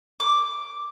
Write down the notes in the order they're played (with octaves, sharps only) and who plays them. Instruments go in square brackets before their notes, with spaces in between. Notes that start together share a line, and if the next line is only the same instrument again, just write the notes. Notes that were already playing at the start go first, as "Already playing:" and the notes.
[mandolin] D6